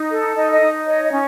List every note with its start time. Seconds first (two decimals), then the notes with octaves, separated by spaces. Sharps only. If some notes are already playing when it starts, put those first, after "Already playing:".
Already playing: D#4
0.10 A4
0.35 D#4 D#5
0.52 D#5
0.61 D#4
0.86 C#5 D#5
1.03 D#5
1.12 C#4